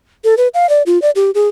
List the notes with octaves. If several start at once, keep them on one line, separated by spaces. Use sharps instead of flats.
A4
B4
F5
D5
F4
D5
G4
G#4